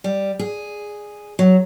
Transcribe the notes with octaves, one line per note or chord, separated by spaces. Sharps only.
G3
G#4
F#3